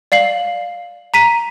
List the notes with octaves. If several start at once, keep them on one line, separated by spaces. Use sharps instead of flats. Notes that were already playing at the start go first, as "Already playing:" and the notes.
D5 F5 C7 F#7
A#5 B6 D#7